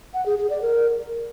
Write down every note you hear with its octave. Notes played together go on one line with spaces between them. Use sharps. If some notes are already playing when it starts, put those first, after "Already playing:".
F#5
G#4
G#4
D5
A#4